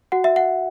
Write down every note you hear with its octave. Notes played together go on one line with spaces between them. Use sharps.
F#4 F#5
E5
F#5